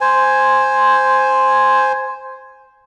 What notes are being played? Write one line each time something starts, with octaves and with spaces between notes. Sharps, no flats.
C5 G#5